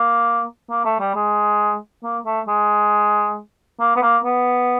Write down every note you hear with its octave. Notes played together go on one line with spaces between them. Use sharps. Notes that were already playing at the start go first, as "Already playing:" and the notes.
Already playing: A#3
A#3
A3
G3
G#3
A#3
A3
G#3
A#3
B3
A#3
B3